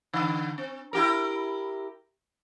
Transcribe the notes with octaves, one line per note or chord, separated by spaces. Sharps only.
D3
C4
E4 G4 A#4